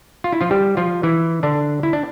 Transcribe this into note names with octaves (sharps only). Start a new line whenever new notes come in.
F4
E4
F3 F4
G3 G4
F3 F4
E3 E4
D3 D4
E4
D4